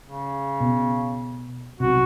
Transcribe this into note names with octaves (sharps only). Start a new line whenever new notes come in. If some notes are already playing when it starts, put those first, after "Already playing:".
C#3
B2
B1 C3 F#4